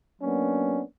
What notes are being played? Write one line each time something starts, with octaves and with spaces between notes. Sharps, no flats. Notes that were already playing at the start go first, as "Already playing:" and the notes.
F#3 A#3 B3 C#4 D4